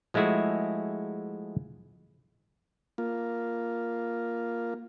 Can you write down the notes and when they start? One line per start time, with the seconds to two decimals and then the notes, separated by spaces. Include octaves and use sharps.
0.14 F3 G#3 A3 E4 F#4 G#4
2.98 A#3 F4